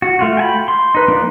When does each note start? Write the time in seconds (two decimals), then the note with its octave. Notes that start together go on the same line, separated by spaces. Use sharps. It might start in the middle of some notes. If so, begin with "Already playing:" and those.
0.02 F#4
0.19 A3 F4 F#4
0.37 G5 G#5 B5
0.68 C6
0.95 D#4 B4
1.08 F3 A#3 D4 D#4